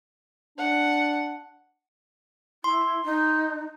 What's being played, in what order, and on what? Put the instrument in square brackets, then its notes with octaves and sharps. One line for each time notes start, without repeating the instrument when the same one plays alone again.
[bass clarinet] D4 [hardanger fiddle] F#5
[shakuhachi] E4 [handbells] C6
[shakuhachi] D#4